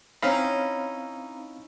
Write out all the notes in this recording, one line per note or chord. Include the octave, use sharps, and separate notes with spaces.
C4 C#4 D#4 E4 F5 B5